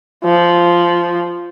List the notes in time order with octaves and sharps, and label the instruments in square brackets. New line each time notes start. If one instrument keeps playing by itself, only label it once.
[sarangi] F3